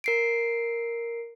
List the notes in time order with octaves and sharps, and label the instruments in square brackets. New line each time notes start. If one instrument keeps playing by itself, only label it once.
[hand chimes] A#4 C7 D7